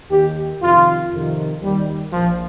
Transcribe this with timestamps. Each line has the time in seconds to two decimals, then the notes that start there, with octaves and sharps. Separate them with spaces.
0.10 D#2 D#3 G4
0.61 F2 C3 D#3 F4
1.12 F2 C3 D#3
1.62 D#2 D#3 G3
2.13 A#1 A#2 F3